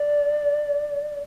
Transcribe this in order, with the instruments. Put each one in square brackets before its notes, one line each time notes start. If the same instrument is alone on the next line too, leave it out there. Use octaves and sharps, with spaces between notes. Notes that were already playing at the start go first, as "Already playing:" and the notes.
Already playing: [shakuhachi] D5